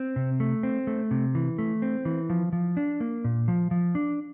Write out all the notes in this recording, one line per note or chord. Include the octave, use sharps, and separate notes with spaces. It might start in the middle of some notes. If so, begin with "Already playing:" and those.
Already playing: C4
C3
A3
C4
A3
C3
E3
A3
C4
E3
F3
F3
D4
A#3
A#2
F3
F3
D4